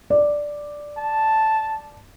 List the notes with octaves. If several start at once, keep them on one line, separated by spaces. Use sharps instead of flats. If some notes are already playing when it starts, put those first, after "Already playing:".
D5
A5